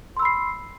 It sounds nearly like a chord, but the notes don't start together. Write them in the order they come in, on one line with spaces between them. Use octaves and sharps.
C6 E6 B5 C7